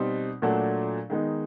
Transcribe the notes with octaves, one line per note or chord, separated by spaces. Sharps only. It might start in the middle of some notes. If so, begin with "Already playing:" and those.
Already playing: B2 G3 C4 D#4
A#2 F#3 A3 D4
D#3 G#3 B3 D#4